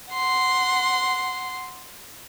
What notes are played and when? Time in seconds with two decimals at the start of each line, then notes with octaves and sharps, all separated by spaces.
0.13 F#5 C6